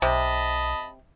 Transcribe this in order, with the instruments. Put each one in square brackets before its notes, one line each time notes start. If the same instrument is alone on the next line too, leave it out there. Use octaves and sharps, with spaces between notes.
[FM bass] B1 [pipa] C3 [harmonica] D#5 A5 B5